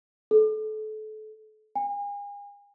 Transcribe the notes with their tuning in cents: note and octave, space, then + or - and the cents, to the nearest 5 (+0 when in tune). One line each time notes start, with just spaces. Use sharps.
A4 -30
G#5 -40